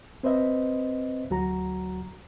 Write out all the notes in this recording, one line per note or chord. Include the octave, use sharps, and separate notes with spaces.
C4 B4 C5 D#5 E5
D2 F#3 F#4 A#5